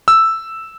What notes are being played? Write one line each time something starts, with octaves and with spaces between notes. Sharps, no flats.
E6